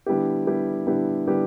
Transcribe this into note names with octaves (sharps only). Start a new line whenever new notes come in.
D3 G3 B3 E4 G4
D3 G3 B3 E4 G4
D3 G3 B3 E4 G4
D3 G3 B3 E4 G4